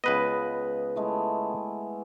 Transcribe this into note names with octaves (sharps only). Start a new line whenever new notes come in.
C#2 B3 B4 D#5
G#3 A3 E4